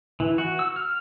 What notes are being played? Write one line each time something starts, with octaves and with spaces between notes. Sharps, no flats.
E3
F#4
E6
F6